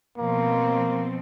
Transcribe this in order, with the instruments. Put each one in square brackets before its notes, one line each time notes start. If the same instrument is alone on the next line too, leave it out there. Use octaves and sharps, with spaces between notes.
[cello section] B2 F3 C4 [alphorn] A#3